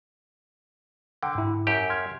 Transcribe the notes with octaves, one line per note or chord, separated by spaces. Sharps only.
D3 F#5 G5
G#2 E4
F#2 G4
C6 F6 G#6